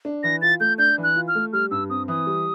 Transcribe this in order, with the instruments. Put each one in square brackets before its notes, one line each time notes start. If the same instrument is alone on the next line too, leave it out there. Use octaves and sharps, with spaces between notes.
[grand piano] D4
[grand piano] E3 [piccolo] A#6
[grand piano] F4 [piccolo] A6
[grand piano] A3 [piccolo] G6
[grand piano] D4 [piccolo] G6
[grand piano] E3
[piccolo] F#6
[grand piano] F4
[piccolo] F6
[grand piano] A3
[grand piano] G3 [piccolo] F6
[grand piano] G2 [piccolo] E6
[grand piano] C4 [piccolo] D#6
[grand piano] E3 [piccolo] D#6
[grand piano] G3